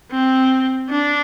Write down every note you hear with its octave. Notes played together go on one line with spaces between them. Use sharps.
C4
D4